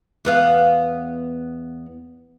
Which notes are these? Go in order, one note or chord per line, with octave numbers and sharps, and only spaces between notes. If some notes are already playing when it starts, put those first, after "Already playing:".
E2 B3 F5